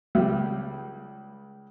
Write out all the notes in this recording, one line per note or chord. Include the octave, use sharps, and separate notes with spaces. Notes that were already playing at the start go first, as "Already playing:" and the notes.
C#2 G3